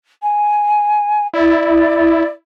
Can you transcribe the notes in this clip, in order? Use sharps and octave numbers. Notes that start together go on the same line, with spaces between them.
G#5
E4 D5